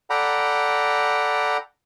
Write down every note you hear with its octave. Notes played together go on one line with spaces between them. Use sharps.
A4 D5 F#5 G5 A#5 B5